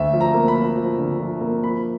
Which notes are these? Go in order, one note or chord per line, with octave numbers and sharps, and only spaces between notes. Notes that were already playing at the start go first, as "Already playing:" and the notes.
Already playing: D2 E5
F3
A#5
A#3
B5
F3
F3
D3
F3
A#3
F3 B5